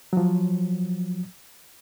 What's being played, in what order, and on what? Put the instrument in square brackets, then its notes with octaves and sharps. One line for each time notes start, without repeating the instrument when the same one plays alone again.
[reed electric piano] F3 F#3